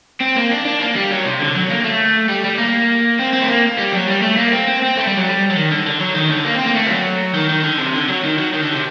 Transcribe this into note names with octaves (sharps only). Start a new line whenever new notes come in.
C4
A#3
D4
D4
A#3
G3
F#3
C3
D3
F#3
A#3
A3
G3
G3
A#3
C4
C4
A3
A#3
G3
F#3
G3
A3
A#3
C4
C4
C4
A3
G3
F#3
G3
F#3
D#3
D3
D3
F#3
D#3
D3
A#3
C4
A#3
A3
D#3
F#3
D#3
D#3
D3
C3
D3
F#3
D#3
F#3
D#3
D3
C3